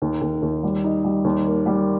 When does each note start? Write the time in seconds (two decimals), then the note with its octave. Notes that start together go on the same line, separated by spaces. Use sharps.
0.02 D#2
0.21 D#2
0.42 D#2
0.63 G3
0.84 D#4
1.04 G3
1.24 D#2
1.46 A#3
1.66 G3